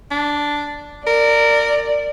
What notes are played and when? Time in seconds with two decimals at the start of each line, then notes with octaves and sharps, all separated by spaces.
0.11 D4
1.07 A#4 D5